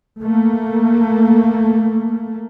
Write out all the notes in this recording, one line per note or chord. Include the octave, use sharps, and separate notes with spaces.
A3 A#3